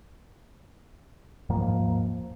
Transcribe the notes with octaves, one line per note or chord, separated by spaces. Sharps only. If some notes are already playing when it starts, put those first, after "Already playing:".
D#1 G#2 F3 A#3